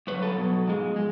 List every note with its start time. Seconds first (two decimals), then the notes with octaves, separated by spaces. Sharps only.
0.07 G2 D3 F#3 B4 C#5
0.22 A4 B4
0.37 B2 F#3
0.67 G#2 F3 G#3
0.96 G#3